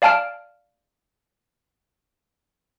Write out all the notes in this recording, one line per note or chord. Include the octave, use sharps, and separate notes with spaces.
D5 F5 G#5 A5 F6 D7